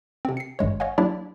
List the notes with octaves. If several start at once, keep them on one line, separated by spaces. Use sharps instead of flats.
C3 C4
C7 C#7
G#1 G2 G#3 C#5
C#5 D#5 F5 F#5 G#5
F#3 A#3 D4 E4 G4 D5